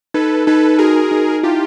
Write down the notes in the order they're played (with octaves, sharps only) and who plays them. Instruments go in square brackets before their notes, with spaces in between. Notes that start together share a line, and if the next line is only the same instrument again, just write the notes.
[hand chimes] D#4 [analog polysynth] A4 B4
[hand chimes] D#4 [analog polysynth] A4 B4
[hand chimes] F#4 [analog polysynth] G#4 A#4
[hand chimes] D#4
[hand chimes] E4 [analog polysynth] F4 G4